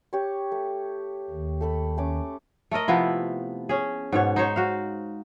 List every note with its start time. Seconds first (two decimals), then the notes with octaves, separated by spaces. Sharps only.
0.13 G4 C#5
0.52 A3
1.30 D#2 D#3
1.61 A3 A4 B5
1.97 A3 C#4 D6
2.71 A3 A4 A#4 D#5
2.88 C3 F3 B3 E4
3.69 C#4 G#4
4.13 G#2 B2 C#5
4.36 D#4 C5 C#5
4.56 F#4 F5